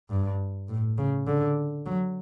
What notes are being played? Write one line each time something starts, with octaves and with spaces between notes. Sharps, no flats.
G2
A2
C#3
D3
F#3